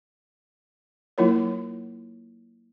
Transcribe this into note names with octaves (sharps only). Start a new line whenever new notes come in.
F#3 A#3 E4 F4 A#4 C#5